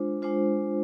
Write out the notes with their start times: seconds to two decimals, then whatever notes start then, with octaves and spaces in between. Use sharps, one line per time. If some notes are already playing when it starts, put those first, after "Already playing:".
Already playing: G#3 D4 F4 C5
0.22 G#3 D4 F4 C5